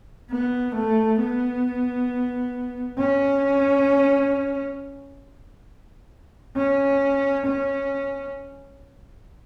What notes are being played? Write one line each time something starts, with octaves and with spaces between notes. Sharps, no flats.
B3
A3
B3
C#4
C#4
C#4